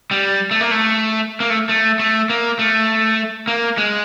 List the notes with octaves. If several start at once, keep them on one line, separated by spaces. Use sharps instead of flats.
G3
A3
A#3
A3
A#3
A3
A3
A3
A#3
A3
A#3
G#3